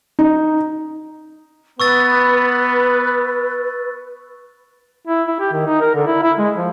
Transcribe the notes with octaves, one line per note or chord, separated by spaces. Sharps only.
D#4
B3 B4 C#6 E6 A6
E4
E4
G4
D#3
D#4
A#4
D3
E4
E4
G#3
F3